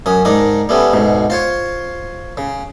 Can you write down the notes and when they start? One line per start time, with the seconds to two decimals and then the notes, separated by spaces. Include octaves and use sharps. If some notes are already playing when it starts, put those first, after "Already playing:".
0.06 F#2 C#4 D#6
0.25 G#2 D#3 D4 D#4 D#6
0.69 G3 A3 B3 C#4
0.93 D2 G#2 B2
1.30 F4 C5 C#5
2.37 C#3